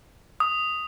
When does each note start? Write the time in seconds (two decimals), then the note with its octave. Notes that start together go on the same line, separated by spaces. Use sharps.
0.40 D#6